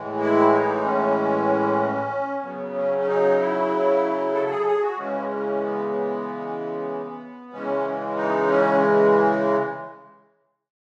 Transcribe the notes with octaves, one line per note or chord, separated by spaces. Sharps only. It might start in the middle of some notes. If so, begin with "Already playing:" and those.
Already playing: A2 E3 G#3
E4
D#4
C#4
C#3 F#3 B3
C#4
C#4
D#4
E4
A4
G#4
A4
G#4
F#4
C#3 E3 G#3 C#4
C#4
B3
B3
C#3 E3 G#3 C#4
D#4
C#4